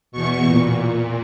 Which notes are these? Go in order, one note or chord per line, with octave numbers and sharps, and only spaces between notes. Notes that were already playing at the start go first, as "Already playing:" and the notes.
E2 B2 C#6
A#2
A#2